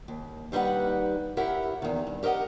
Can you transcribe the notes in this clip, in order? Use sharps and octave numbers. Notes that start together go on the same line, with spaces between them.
D#2
D#2 G3 D#4 B4 F#5
E4 G4 A#4 C#5 E5 F#5
E2 D#3
G2
G4 A#4 B4 D#5 F#5